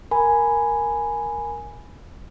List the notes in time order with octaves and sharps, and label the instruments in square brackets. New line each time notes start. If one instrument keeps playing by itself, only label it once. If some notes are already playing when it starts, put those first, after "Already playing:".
[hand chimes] A#4 G#5 B5